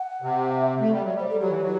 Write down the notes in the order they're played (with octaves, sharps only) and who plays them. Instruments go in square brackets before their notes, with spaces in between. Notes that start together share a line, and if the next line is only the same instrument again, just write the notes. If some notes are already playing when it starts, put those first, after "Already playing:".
Already playing: [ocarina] F#5
[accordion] C3
[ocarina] E5
[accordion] A3
G3
F#3
[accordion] G3 [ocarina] D5
[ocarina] C5
A4
[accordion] F#3 [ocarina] G4
[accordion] E3
F#3